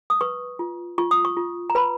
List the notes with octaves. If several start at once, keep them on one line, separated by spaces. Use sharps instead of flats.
D#6
B4 C#6
F4
F4 C#6
D#6
C#6
F4
A#5
B4 B5